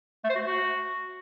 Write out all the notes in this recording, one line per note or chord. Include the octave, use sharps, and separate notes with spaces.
A3
C5
F#4
A3
F#4